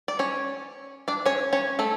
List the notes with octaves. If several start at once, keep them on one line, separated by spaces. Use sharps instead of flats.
D5
C#4 C#5
D4 D5
C#4 C#5
C#4 C#5
A3 A4